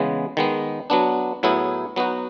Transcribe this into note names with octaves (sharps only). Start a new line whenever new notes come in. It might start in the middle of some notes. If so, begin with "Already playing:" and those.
Already playing: C#3 E3 G#3 B3
D#3 G#3 B3
F#3 B3 D4
A2 F#3 B3 E4 G#4
F#3 B3 D#4 F#4